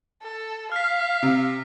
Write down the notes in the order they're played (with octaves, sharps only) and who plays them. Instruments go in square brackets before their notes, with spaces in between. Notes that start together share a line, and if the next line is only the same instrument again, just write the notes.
[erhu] A4
[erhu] F5 [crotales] F6 B6
[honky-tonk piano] C3